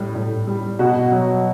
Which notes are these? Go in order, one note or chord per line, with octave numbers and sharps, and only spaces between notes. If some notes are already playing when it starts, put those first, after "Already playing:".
Already playing: A2 G3
A2
G3
B2 F#4
F#3